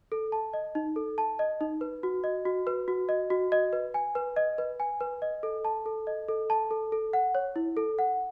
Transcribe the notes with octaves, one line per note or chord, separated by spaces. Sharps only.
A4
A5
D#5
D#4
A4
A5
D#5
D#4
B4
F#4
D#5
F#4
B4
F#4
D#5
F#4
D#5
B4
G#5
B4
D#5
B4
G#5
B4
D#5
A4
A5
A4
D#5
A4
A5
A4
A4
F#5
C#5
E4
A4
F#5